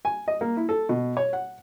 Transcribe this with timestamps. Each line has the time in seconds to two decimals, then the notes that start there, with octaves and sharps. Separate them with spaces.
0.05 G#5
0.28 D#5
0.41 A#3
0.57 E4
0.69 A4
0.89 B2
1.17 C#5
1.33 F#5